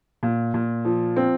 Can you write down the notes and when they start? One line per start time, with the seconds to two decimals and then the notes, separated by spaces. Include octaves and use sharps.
0.23 A#2
0.54 A#2
0.85 F3
1.16 C4